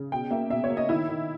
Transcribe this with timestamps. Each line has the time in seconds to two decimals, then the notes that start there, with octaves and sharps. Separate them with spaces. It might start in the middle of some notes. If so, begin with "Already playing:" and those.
Already playing: C#3
0.12 B2 G5
0.31 A#3 E5
0.50 B2 E5
0.64 C#5
0.70 A#3
0.77 D#5
0.89 D#3 E4
1.09 D#3